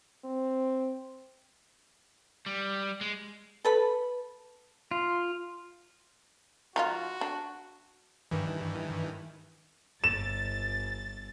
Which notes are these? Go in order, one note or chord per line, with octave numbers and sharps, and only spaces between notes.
C4
G3
G#3
A4 B4 B5
F4
F3 D#4 F4 F#4
D4
G2 D#3 E3
G1 A6 E7